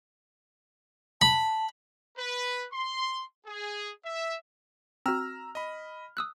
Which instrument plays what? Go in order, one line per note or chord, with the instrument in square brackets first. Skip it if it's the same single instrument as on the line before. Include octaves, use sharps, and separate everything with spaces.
[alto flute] A5 [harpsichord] B5
[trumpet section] B4
C6
G#4
E5
[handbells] C4 F#4 [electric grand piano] A#5 E6 F6
[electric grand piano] D#5 B5
[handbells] D#6 E6 F#6